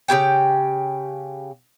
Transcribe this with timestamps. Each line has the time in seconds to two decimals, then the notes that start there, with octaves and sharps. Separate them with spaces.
0.08 C#3 E4 G4 G5